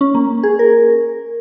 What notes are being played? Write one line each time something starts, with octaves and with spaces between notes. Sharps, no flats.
C#4
A#3
G#4
A#4